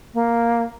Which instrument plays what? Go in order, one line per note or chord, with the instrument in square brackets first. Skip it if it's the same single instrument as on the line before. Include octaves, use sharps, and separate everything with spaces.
[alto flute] A#3